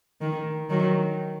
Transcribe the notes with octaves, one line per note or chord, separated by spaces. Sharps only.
D#3
D#3 F#3